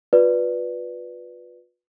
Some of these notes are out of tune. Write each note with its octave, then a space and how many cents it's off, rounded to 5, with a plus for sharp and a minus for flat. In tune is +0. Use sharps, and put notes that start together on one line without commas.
F4 +40 B4 -5 D5 +0